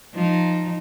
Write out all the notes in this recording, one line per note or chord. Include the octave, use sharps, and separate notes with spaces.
F3 D#4